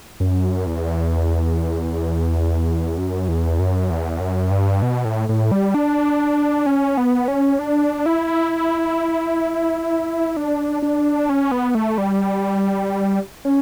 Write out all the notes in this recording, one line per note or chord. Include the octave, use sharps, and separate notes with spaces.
F#2
E2
F#2
E2
F#2
E2
F#2
G2
B2
A2
A2
G3
D4
C#4
B3
C#4
D4
E4
D4
D4
C#4
B3
A3
G3
C#4